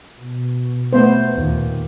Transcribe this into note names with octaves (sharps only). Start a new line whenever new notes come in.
B2
A3 B3 C5
D#2 A#2